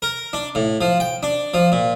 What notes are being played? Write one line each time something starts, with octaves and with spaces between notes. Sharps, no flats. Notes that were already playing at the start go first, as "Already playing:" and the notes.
A#4
D4
A2
F3
G5
D4
F3
A#2